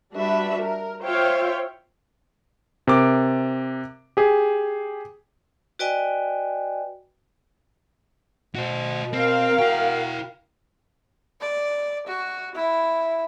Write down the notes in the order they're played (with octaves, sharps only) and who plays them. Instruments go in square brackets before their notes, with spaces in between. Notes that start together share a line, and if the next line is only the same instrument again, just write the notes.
[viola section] G3 D4 F#4 B4 E5
A#4
F4 C5 C#5 E5 F5 G5
[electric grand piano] C3 A#4 D6
G4 G#4
[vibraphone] F#4 B4 D5 D#5 G5 G#5
[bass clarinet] B2 [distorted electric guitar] F#4 C5
[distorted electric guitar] C4 [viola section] A#4 F5
[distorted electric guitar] E4 G5 [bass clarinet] F#4
[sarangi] D5
F#4
E4